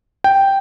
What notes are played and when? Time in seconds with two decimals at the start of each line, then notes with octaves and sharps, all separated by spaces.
0.24 G5